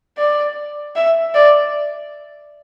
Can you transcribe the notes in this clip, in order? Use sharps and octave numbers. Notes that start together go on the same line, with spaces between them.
D5
E5
D5